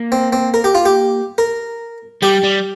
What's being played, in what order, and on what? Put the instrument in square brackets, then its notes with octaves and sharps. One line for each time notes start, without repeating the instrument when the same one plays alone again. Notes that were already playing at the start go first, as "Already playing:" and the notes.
Already playing: [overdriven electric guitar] A#3
[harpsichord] C4
C4
A#4
G4
F4
G4
A#4
[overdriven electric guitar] G3 [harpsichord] G4
[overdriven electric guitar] G3